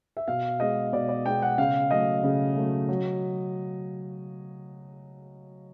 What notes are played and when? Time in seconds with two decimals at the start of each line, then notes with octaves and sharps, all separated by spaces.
0.17 E5
0.28 B2 F5
0.60 G#3 B3 D#5
0.93 B2 D5
1.09 D5
1.26 G#3 B3 G5
1.42 F#5
1.58 C#3 F5
1.91 F#3 A3 D#5
2.23 C#3
2.57 F#3 A3
2.89 F#3